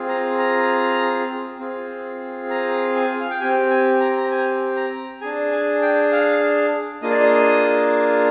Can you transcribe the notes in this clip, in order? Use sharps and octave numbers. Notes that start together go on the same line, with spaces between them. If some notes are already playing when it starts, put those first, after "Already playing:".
Already playing: C4 F4 G#4
A#5
A#5
C4 F4 G#4
A#5
G#5
F5
G5
C4 G4 G#5
G#5
A#5
A#5
G#5
A#5
D4 G#4 G#5
G#5
G5
F5
A#3 D4 F4 G#4 D#5
D5
D#5